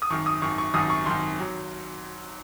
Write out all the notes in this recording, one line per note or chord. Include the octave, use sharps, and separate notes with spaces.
D#6
G#1 F#2 D#3 C#6
D#6
G#1 F#2 D#3 C#6
C#6
G#1 F#2 D#3 D#6
C#6
G#1 F#2 D#3 C6
D#3 F#3